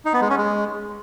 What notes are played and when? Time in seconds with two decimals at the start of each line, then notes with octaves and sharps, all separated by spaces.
0.05 D#4
0.13 B3
0.21 G#3
0.30 C#4
0.38 G#3